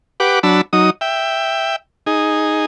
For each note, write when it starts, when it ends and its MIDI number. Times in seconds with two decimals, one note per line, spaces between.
0.20 0.39 67
0.20 0.39 71
0.20 0.39 78
0.20 0.39 86
0.43 0.61 54
0.43 0.61 62
0.43 0.61 81
0.43 0.61 83
0.43 0.61 88
0.73 0.90 54
0.73 0.90 63
0.73 0.90 87
1.01 1.76 76
1.01 1.76 79
2.07 2.66 63
2.07 2.66 68